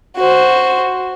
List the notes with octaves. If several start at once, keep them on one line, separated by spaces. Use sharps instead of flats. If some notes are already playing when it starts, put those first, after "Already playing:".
F#4 C5